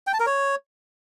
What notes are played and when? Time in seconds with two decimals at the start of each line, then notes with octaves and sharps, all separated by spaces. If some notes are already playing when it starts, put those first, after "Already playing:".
0.07 G5
0.13 A5
0.20 A#4
0.26 C#5